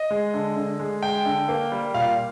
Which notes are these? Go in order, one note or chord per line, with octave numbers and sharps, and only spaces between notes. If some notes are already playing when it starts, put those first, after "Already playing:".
Already playing: D#5
G#3
D3
D3
G#3
G#3 G5
D3
A#3
G3
A#2 F5